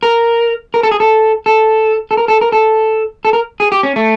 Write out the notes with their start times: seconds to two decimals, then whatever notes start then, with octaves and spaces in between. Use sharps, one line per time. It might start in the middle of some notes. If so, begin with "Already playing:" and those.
0.03 A#4
0.74 A#4
0.83 A4
0.91 G#4
1.00 A4
1.46 A4
2.11 A4
2.17 A#4
2.28 A4
2.41 A#4
2.52 A4
3.25 A4
3.33 A#4
3.60 G#4
3.72 G4
3.83 C#4
3.96 A3